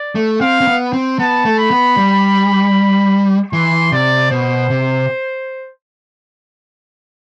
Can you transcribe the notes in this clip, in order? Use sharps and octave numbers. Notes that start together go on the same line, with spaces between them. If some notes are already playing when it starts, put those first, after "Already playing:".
Already playing: D5
A3
C4 F5
C4
B3
C4
B3 A5
A3
B5
B3
G3
E3 C6
C3 D5
B2 C5
C3